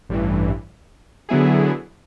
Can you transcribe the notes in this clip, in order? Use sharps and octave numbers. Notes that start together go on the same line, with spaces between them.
A1 G2 E3
D3 F#3 B3 E4 G#4